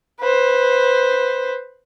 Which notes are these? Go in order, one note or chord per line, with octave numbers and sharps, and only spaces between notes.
B4 C5